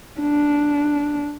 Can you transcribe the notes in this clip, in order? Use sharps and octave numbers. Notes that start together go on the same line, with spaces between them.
D4